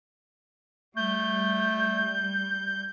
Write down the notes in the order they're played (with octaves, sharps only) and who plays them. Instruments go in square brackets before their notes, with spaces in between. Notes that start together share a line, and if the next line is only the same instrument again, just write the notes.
[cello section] G3 [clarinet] A3 [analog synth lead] G6